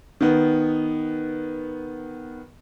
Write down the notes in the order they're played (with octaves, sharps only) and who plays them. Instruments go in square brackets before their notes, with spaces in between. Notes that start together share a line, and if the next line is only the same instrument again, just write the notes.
[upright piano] D#3 B3